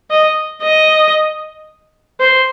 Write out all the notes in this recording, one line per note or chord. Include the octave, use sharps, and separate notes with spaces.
D#5
D#5
C5